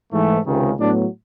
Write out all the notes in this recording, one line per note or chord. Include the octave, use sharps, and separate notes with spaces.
G#2 E3 A3
C#2 C3 D#3
A2 F#3 B3 D4